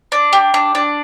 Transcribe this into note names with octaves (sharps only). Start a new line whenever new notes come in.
D4
G4
D4
D4